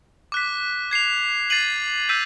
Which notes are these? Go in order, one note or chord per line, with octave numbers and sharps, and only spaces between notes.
D6 F#6 B6
G#6 C7 F7
A6 C7 D#7 F#7
E6 G6 B6 D#7